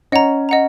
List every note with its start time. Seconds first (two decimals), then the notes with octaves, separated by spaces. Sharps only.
0.12 C#4 D#5 F#5 A#5
0.49 D#5 F#5 A#5